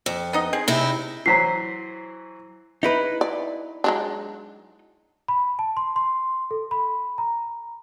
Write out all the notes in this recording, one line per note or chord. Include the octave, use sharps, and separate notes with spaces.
F2
B3 D#4 D#5
C4 G#4
C3 D#4 E4
E3 F#3 C5 A#5 B6 C7
D#4 E4 B4
D5
F#3 G#3 D4
B5
A5
C6
C6
A4
B5
A#5